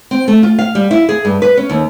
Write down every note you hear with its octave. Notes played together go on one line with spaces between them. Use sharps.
C4
A3
F4
F5
G3
E4
G#4
G2
B4
C#4
D#2